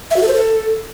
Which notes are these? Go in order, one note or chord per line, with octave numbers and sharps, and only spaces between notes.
E5
F#4
A4
C5
A4